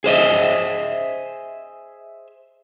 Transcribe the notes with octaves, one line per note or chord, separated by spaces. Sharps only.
G#4 C5 D#5 E5